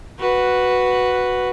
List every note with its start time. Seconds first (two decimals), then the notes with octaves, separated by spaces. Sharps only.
0.19 F#4 B4